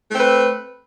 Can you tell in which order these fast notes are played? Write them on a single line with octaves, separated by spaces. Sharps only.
A3 C4 B4